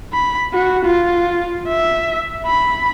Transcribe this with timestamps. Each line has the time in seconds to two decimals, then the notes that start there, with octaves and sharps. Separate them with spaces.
0.13 B5
0.53 F#4
0.84 F4
1.68 E5
2.46 B5